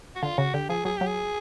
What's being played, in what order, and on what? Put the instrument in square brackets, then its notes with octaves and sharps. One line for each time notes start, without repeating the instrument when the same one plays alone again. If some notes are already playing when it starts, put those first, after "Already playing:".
[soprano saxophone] F#4
[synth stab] D3 [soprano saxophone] F4
[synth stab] C#3 [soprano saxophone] F#4
[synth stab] D3 [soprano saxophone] G4
[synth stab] F3 [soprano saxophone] G#4
[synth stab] F#3 [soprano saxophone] G#4
[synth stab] F#3 [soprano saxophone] G4
[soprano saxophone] G#4